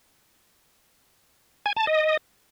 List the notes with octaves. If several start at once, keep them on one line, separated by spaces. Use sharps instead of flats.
G#5
A5
D#5